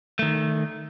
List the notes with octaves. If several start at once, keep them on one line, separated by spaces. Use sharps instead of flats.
D#3 A3